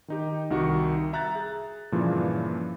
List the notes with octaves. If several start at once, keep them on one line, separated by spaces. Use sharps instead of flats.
D#3 D#4 G4
C2 D#3 F#4 G4 C#7
E5 A#5 F#6 G6 A6
G#4
G2 A#2 C#3 E3 F3